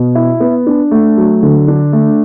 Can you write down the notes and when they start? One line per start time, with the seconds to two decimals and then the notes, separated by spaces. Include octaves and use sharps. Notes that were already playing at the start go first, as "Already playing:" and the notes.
Already playing: B2
0.15 E4
0.40 B3
0.67 D4
0.91 A3
1.17 F#3
1.43 D3
1.68 D4
1.93 A3